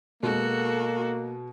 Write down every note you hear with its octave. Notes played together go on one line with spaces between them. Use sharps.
B2 G#3 A#3 F#4 A4